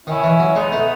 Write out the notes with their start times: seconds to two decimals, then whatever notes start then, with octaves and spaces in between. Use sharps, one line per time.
0.06 D#3 C#4 E4
0.23 E3
0.40 F#3
0.55 G#3 B3 D#4
0.72 A3